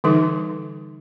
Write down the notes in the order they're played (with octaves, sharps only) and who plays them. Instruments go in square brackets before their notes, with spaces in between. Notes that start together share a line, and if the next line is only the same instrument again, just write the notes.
[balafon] D3 E3 G3 D#4 A4